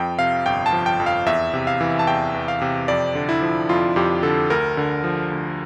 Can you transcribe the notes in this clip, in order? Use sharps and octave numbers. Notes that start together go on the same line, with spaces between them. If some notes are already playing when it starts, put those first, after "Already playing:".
Already playing: F2 F3 G5
C3 F5
G1 G5
A5
F3
G5
F2
F5
E2 E5
C3
F5
E3
A5
E2 G5
E2
F5
C3
F2 D5
D3
E4
F3
F2 F4
F2 G4
D3 A4
D2 A#4
D3
F3
D2